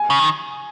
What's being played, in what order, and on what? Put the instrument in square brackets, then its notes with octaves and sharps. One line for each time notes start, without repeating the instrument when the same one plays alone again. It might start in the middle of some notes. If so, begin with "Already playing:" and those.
Already playing: [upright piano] G#5
[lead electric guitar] C#3
D#3